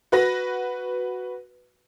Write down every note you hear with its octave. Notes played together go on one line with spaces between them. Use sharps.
F#4 B4 A#6